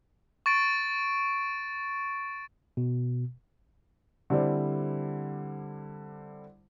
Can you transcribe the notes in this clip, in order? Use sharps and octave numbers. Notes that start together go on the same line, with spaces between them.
C#6 A6 D7
B2
D3 G3 C4 E4 C5 D5